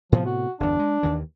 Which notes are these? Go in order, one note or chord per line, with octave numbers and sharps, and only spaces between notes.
A2 C3 F3 B3
F#4
G1 E2 D4
G#3
D#2 D#3 E3